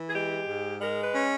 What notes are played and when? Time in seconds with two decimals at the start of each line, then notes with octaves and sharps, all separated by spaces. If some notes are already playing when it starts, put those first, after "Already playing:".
Already playing: E3
0.09 G#4
0.14 G#3 G4
0.48 G#2
0.80 G#3 A#4
1.03 B4
1.15 C#4